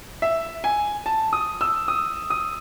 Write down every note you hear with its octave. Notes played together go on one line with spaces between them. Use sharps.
E5
G#5
A5
D#6
E6
D#6
D#6